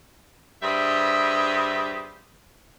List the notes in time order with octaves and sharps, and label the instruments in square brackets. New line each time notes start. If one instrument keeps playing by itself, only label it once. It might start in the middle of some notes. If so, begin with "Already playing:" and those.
[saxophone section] G2 G4 G#4 B4 C5 E5